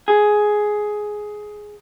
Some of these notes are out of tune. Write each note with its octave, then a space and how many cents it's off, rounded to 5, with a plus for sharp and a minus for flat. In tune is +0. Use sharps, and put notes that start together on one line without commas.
G#4 +10